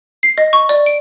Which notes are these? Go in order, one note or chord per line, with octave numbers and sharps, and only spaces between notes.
C7
D#5
C#6
D5
D7